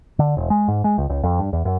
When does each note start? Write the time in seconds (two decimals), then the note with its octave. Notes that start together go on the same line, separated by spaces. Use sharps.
0.19 D3
0.37 E1
0.50 G#3
0.68 G#2
0.84 G#3
0.98 C#2
1.10 C#2
1.23 F2
1.39 G2
1.53 E2
1.65 F#2